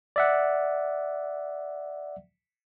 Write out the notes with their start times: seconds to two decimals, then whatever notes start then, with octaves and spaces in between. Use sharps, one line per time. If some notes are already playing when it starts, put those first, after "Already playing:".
0.16 D5 E5 F#5